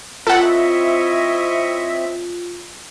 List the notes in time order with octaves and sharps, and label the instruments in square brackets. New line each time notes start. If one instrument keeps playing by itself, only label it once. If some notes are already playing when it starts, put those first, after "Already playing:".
[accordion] C4 E5 [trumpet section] E4 C#5 D#5 [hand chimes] F4 [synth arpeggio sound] A4 F#5